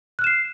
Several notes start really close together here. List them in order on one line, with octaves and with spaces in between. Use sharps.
F#6 F6 E7 C7